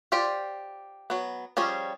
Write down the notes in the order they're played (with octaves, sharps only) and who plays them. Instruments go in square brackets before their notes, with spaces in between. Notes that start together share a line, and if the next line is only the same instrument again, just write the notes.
[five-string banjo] F4 G4 C5 D5
F#3 B3
F3 G3 C#4 G#4